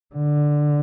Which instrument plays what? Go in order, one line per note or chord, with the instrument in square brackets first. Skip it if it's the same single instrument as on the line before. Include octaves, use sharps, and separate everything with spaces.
[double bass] D3